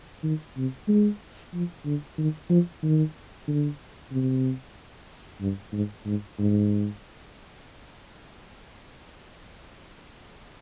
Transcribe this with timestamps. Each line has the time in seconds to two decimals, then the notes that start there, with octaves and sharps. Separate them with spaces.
0.23 D#3
0.57 C3
0.88 G#3
1.54 F3
1.85 D3
2.18 D#3
2.49 F3
2.83 D#3
3.47 D3
4.12 C3
5.40 G2
5.73 G#2
6.05 G#2
6.38 G#2